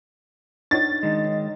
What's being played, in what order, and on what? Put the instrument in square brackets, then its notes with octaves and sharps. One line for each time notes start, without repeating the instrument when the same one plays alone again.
[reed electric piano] D4 D#4 C#5 [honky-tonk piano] A6
[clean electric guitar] D#3 G#3 [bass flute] D#5